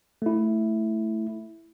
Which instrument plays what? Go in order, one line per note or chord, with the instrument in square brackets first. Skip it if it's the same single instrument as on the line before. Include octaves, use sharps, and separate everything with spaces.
[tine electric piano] A3 E4